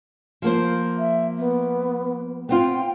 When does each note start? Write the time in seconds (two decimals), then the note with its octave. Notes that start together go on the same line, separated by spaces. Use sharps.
0.42 F3 A#3 C5
0.98 E5
1.38 B3
2.49 B3 C4 F4 G5